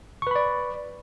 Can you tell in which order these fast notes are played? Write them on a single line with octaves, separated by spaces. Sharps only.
C#6 B4 B5 D5